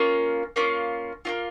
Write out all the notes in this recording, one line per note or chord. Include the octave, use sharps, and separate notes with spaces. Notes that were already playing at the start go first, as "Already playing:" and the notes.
Already playing: A#3 C#4 F4
A#3 C#4 F4
A#3 C#4 F4